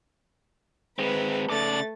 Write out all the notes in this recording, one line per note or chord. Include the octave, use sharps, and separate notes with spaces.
G#3 C4 B4
C#3 A3 D5 A6